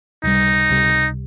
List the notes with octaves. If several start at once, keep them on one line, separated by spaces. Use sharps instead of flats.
C#2 C3 G3 D#4
C#2 C3 G3